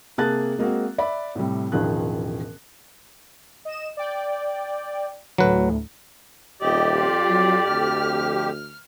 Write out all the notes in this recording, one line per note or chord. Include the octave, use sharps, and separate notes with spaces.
C3 A#3 G#4 A5 F#6 A6
G#3 A#3 C4 F#4
D5 E5 B5
A2 C3 G3
E1 A1 D#3 F3 G#4 F#6
D#5 E7
D5 G5
D2 A2 F#3 B4
D#1 F2 G4 D5 D#5
F4
F#3
D2 F6